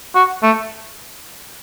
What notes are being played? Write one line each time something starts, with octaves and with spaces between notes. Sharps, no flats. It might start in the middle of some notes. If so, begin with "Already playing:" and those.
F#4
A3